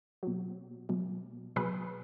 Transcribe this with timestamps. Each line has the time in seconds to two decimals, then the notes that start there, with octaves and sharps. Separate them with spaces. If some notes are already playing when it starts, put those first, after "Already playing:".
0.23 B2 F#3
0.89 B2 F#3
1.56 B2 F#3 G#4 B4